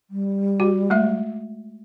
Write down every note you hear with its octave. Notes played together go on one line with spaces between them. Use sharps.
G3
F#4
G#3 A3 E5